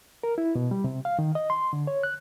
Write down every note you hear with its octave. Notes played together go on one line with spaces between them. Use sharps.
A#4
E4
B2
G3
C3
F5
D#3
D#5
C6
D3
C#5
F#6